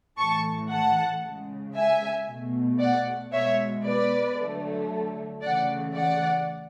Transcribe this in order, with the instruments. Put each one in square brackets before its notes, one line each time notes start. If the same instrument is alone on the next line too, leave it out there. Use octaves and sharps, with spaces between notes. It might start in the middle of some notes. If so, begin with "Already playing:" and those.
[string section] A2 E3 A3 A5 C#6
F#5 A5
C#3 G#3
E5 G#5
B2 A3
D5 F#5
B2 G#3 C#5 E5
B4 D5
D3 F#3 A3
C#3 E3 A3 D5 F#5
D5 F#5